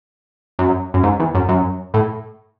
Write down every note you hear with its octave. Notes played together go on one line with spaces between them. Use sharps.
F#2
F#2
G#2
E2
F#2
F#2
A2